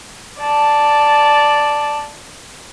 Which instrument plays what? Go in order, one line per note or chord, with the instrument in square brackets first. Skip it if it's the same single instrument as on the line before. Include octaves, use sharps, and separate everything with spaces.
[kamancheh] D5 A5